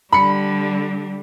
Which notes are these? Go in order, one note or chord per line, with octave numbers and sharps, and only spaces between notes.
D3 G3 B5 C#7